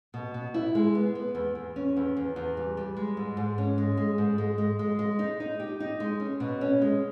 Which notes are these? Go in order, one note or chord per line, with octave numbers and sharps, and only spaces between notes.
B2
B2
E4
G#3
B3
B3
E2
E2
C#4
E2
E2
E2
G3
G3
G#3
G#2
G#2
C#4
G#3
G#3
G#2
G#3
G#3
G#3
G#3
D#4
D#4
G4
D#4
G#3
C#4
B2
C#4
G#3